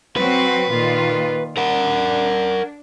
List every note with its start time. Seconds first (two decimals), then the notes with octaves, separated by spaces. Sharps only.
0.16 F#3 C4 F#4 B4
0.70 A#2 D#3 F4
1.57 D4 A#4 F#5